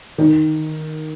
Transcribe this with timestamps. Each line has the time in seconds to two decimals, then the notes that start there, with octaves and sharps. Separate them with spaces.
0.18 D#3